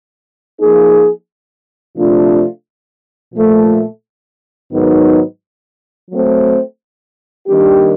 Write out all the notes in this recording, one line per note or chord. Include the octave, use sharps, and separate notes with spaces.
F3 A#3 D#4 G#4
C3 F3 A3 D4 F4
A#2 F3 A3
G#2 D#3 F#3 B3 D#4
F#3 A3 C4
D#3 G3 A#3 D4 G4